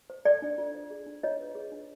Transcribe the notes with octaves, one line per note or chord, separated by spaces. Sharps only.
C5
A4 D5
D4
F4
C5
G#4
D4
F4 C#5 D#5
B4
G#4
D4